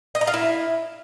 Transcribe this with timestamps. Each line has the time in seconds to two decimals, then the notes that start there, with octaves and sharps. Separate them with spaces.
0.15 D#5
0.21 A#5
0.27 F4
0.34 E4